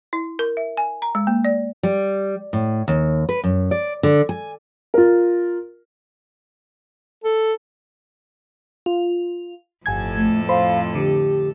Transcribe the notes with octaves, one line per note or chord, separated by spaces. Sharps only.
E4
A#4
E5
G#5
A#5
G#3
A#3
D5
G3
A2
D#2
B4
F#2
D5
D3
G#5
F4 A#4
A4
F4
G1 F2 A2 A4 G#5 G#6
A3
C5 F5 B5 C6
D3 G4